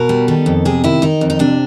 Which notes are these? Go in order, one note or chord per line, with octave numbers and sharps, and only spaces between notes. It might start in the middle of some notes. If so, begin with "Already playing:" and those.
Already playing: B2 A#4
G3
D#3 A4
F2
C3 G#4
D#3 E4
D#3 D#4
F2
D#4
C3 D4